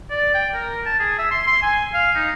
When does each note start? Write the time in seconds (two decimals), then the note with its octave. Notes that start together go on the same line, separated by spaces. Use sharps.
0.10 D5
0.34 G5
0.54 A#4
0.86 A5
1.00 G#4
1.19 E5
1.31 C6
1.47 C6
1.62 G#5
1.94 F5
2.15 D#4